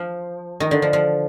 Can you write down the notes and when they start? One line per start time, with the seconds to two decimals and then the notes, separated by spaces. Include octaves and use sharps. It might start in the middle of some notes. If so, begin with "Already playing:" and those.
Already playing: F3
0.60 D#3
0.71 D3
0.82 F3
0.93 F3